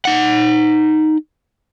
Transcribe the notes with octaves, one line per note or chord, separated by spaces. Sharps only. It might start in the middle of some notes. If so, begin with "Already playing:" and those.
D#4 F#5